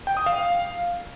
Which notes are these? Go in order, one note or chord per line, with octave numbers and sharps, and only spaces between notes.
G5
D#6
F5